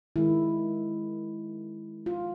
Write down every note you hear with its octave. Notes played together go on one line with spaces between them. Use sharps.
D#3 G#3 E4
F4